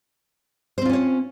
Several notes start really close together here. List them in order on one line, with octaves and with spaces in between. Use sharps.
C5 C4 F4 C#4 C#5